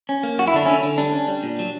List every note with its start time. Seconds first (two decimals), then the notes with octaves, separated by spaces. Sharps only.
0.09 C#4
0.23 A#3
0.38 F#2 F#4
0.48 E4
0.53 D3 D4
0.65 D3 C#4 E4
0.83 D3
0.98 G3 D4
1.13 C#4
1.28 G3
1.43 A#2
1.59 F#3